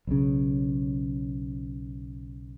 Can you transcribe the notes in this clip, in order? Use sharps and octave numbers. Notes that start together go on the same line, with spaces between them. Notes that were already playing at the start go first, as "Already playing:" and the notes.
B1 C#3